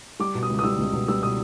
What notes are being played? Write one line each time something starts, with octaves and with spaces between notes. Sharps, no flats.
G3 D6
B2
D#6
C#2
D#6
G3 E6
C#2
B2
G3 E6
B2 D#6